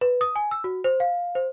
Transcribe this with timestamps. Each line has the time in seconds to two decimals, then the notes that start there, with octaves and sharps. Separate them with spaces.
0.01 B4
0.21 D#6
0.36 G#5
0.51 E6
0.64 F#4
0.84 C5
1.00 F5
1.35 C5